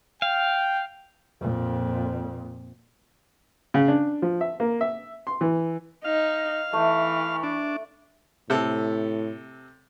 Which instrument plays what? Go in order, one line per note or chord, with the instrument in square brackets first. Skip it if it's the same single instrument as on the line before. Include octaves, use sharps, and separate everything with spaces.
[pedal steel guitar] F5 [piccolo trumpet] G5
[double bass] F2 A#2
[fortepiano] C#3
D4
F3
E5
A#3
E5
C6
E3
[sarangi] D#4 [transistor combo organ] F5
[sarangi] E3 [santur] A3
[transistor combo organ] D4
[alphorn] A2 [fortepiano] C3 A4